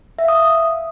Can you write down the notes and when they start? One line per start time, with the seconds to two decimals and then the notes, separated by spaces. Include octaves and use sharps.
0.19 E5
0.23 F5
0.28 D#6